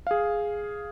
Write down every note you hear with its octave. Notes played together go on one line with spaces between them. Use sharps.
G#4 F5